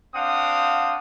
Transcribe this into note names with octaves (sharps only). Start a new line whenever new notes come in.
C4 D4 F5 F#5 D#6